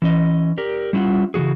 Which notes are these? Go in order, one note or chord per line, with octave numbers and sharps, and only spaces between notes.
E3 C#4 D#5
G4 A#4 D5
G3 C#4 E4 F4 F#5
C#3 E3 F3 F#4 G#4